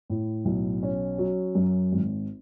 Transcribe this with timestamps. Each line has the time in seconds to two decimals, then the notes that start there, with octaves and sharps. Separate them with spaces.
0.10 A2
0.45 B1
0.83 C#4
1.18 F#3
1.55 F#2
1.92 G#1